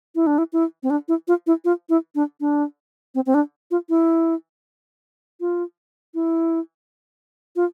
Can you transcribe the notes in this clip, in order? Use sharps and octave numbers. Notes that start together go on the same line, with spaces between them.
E4
D4
E4
E4
C4
D4
E4
F4
E4
F4
E4
D4
D4
C4
C4
D4
F4
E4
F4
E4
F4